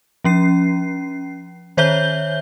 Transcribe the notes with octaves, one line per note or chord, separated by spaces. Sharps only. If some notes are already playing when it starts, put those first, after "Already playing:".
F3 C#4 C7
D#3 C5 C#5 E5 G6 G7